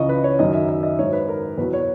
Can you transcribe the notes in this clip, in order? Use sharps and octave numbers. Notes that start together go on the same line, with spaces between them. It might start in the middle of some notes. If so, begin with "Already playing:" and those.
Already playing: C#2 C#3 E3 D#5 C#6
B4
C#5
F#2 D#3 F#3 D#5
E5
E5
D#5
G#2 F#3 C#5
B4
A#4
E2 B2 F#3 B4
C#5